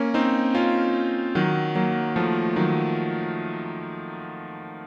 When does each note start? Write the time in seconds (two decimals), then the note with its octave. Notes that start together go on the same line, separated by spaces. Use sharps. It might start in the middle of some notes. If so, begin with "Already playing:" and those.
Already playing: A#3 C#4
0.14 C4 D#4
0.55 C#4 F4
1.35 D#3 F#3
1.75 F#3 A#3
2.16 F3 A3
2.56 D#3 F#3